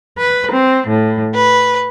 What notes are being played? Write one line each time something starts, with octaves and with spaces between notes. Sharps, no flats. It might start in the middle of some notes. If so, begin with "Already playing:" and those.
B4
C4
A2
B4